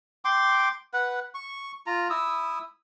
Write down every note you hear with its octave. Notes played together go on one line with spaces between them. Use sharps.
G5 C6 D6
B4 F#5
C#6
F4 A#5
E4 D#6 E6